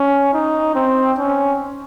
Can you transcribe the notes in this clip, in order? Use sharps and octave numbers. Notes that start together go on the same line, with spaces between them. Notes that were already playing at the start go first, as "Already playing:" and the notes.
Already playing: C#4
D#4
C4
C#4